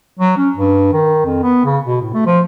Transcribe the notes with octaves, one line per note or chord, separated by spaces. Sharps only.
F#3
C#4
G2
D#3
F2
B3
C#3
B2
A2
A3
F3